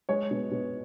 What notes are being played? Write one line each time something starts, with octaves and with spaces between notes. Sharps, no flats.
G#3 C#5
B2
B2